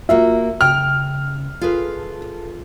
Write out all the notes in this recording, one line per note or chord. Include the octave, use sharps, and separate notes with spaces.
A#3 F4 F#4 E5
C#3 G5 F6
F4 G#4 A4 B4